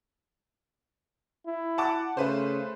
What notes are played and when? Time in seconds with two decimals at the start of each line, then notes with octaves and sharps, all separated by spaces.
1.47 E4
1.78 F#5 A5 D6
2.17 C#3 A3 B4 C5